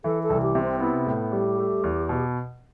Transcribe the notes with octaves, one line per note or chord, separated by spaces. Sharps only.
E3 A4
A4
C2
G4
C3
C4
B3 E4
A2
G3 G4
A3
E2
B2